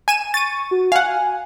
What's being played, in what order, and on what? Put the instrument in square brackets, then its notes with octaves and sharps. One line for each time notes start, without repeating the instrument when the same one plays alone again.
[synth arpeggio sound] G#5 D#7 E7
[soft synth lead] C#6 [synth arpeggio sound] A6 D#7
[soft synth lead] F#4
[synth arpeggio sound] F5 F#5 [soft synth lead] G#5